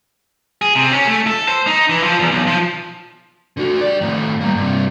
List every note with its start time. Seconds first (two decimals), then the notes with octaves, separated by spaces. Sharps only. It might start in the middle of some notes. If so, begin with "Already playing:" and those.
0.62 G#4
0.75 C3
0.92 C#4
1.06 A3
1.27 A4
1.48 C5
1.67 D#4
1.89 E3
2.03 F3
2.19 E2
2.31 B1
2.47 F3
3.57 D3 F#4
3.81 G4 D5
4.01 A2 D#3
4.41 G3 A#3
4.55 G2 C3